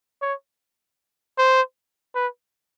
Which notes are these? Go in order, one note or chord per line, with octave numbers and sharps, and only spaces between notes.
C#5
C5
B4